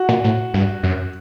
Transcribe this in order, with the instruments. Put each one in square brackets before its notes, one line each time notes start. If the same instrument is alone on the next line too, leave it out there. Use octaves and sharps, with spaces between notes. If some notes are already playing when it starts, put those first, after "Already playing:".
Already playing: [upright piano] F#4
[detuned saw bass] A#2
A2
G2
F#2